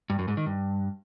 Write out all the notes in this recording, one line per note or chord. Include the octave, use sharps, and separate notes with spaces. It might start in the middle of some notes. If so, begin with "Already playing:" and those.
G2
F#2
G#2
D#3
G2